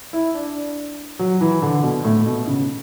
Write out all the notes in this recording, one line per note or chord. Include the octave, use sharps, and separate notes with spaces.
E4
D4
F#3
E3
D3
B2
A2
B2
C#3